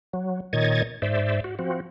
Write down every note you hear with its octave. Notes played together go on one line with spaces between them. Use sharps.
F#3
A#2 D#3 C#5 D#5 G#6 A6
G#2 C5 D5 E5
F#4
F3 C4 F#4